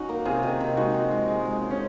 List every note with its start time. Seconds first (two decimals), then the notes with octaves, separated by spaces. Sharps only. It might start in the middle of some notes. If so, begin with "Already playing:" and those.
Already playing: C#4 D#4 F#4
0.09 A#3
0.25 C3 F4 G#4
0.43 D#3
0.60 C3
0.76 G#3 D#4 F#4
0.94 F3
1.11 G#3
1.28 G#3
1.45 G#3
1.62 C#3
1.71 C#4